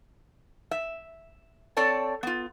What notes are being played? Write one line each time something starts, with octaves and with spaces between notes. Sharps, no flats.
E5
C4 A4 C#5 D5 A5
B3 F4